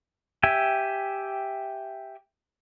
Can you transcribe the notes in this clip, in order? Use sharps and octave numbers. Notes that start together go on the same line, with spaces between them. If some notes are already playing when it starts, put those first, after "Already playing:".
G4 E5 G5 G#5